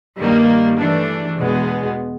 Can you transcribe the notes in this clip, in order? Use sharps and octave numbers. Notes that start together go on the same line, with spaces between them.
G2 D#3 G3 A#3
E3 A3 D4
E2 B2 G#3 B3